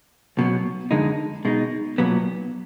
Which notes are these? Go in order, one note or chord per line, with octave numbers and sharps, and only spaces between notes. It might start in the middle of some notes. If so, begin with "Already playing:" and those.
B1 B2 F#3
F2 D3 G#3 D#4
B2 G#3 D#4
B1 A#2 F#3 B3